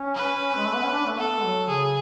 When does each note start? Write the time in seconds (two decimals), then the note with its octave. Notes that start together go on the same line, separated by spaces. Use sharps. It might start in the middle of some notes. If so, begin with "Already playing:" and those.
Already playing: C#4
0.15 B4
0.56 G#3
0.66 A3
0.75 B3
0.83 C#4
0.92 D4
1.06 A3
1.18 B3 A4
1.38 G#3
1.44 F#3
1.69 C#3 G#4